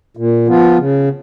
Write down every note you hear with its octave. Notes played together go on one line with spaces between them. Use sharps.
A#2
F3 B3 F4
C#3